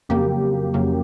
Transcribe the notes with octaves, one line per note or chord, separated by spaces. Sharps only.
F2 C#3 F#3 A#3 G4
F2 C#3 F#3 A#3